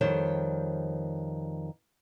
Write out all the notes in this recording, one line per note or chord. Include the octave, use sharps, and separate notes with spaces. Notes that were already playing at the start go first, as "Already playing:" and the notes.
F2 D#3 G3 C5 C#5